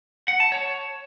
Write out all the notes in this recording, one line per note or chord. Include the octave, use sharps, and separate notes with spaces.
F#5
A5
C#5